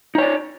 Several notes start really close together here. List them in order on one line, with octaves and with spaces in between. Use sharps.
D#4 C#5 D5